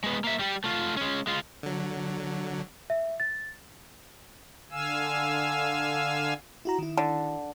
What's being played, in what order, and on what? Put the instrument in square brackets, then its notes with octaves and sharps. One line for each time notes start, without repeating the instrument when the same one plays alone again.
[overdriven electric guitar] G#3 B3
A#3 E5
G3 G4
A3 F4
G#3 C#4
G#3 F4
[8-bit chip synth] D3 F#3
[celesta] E5
A6
[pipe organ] D3 F5 G#5 E6
[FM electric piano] E4 F#4 A#5
D#3 E4
[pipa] D3